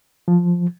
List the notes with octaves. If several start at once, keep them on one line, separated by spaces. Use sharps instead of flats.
F3